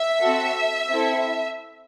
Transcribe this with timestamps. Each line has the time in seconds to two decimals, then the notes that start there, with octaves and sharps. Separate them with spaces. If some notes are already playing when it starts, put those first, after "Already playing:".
Already playing: E5
0.20 C4 F#4 A4
0.91 C4 E4 A4